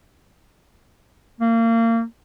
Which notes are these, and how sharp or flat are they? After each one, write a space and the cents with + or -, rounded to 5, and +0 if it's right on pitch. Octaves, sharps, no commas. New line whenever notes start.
A#3 -30